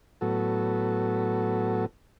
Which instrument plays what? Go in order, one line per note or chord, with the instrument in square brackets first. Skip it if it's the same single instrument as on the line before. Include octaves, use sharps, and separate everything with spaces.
[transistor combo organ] A2 F#3 B3 F#4 A4